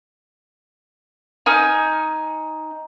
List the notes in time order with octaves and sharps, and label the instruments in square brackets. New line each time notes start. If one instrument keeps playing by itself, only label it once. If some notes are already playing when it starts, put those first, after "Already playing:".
[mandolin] D#4 G#5 F6